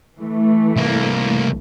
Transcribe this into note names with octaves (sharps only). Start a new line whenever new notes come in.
E3 A3
C2 A#3